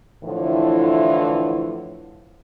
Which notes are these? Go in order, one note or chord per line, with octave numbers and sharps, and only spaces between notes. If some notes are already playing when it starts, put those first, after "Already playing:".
A2 D3 E3 F3